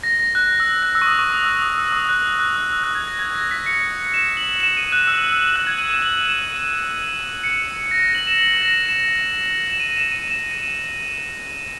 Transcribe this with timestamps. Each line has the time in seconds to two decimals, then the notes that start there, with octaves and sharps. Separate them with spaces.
0.03 A#6
0.20 A#6
0.35 F#6
0.60 E6
0.83 F#6
0.95 E6
1.02 C#6
1.06 D#6
1.19 C#6
1.30 D#6
1.46 E6
1.62 D#6
1.78 E6
1.93 D#6
2.09 F#6
2.40 F#6
2.56 E6
2.72 E6
2.84 F#6
2.95 G#6
3.08 A#6
3.19 G#6
3.35 A#6
3.51 B6
3.66 C#7
4.14 E7
4.37 F#7
4.60 E7
4.77 D#7
4.92 F#6
5.07 E6
5.32 E6
5.56 F#6
5.67 G#6
5.79 D#7
5.90 E7
6.02 F#7
6.26 E7
6.50 D#7
7.44 C#7
7.91 A#6
8.03 A#6
8.15 F#7
8.27 E7
8.39 F#7
8.62 A#6
8.86 E7
9.70 E7
9.80 D#7
9.97 E7
10.12 D#7
10.28 E7
10.51 D#7